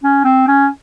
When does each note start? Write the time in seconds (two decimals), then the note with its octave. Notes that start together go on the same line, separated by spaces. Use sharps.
0.04 C#4
0.25 C4
0.48 C#4